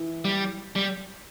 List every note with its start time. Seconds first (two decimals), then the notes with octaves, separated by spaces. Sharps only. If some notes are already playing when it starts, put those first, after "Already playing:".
Already playing: E3
0.25 G3
0.76 G3